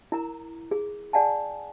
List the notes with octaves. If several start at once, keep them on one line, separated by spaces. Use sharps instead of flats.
E4 A#4 A#5
G#4
G#4 D5 F#5 G#5 A5